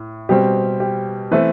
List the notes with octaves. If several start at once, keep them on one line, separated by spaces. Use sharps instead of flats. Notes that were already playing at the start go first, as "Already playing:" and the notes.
Already playing: A2
B2 G3 C4 G4
G4
E3 A3 B3 C4 B4